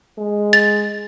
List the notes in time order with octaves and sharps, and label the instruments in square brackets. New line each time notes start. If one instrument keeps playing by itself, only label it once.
[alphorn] G#3
[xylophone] A6